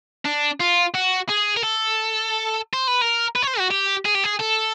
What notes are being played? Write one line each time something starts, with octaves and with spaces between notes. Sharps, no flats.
D4
F4
F#4
G#4
A#4
A4
C5
B4
A#4
B4
C#5
C5
F#4
G4
G#4
G4
G#4
A4